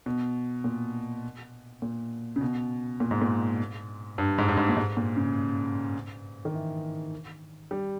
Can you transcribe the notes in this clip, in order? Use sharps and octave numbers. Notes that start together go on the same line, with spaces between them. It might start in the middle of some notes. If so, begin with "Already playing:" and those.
B2
A#2
A#2
C#3
B2
A#2
G#2
A#2
G2
G#2
G2
G#2
A#2
G#2
A#2
C#3
D#3
E3
G3